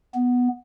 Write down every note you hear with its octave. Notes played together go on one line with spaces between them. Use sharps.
B3